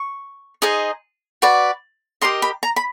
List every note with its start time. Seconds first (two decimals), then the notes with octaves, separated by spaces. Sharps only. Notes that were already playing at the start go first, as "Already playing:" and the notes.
Already playing: C#6
0.62 D#4 G#4 C5 D#5
1.42 F#4 B4 D5
2.22 G4 A#4 D#5 C6
2.42 B5
2.63 A#5
2.76 B5